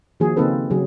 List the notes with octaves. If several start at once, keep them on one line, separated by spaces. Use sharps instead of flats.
D#3 F3 A#3 F#4 G#4
C#3 A#3 C4 D#4 A4 B4
C#3 F#3 G#4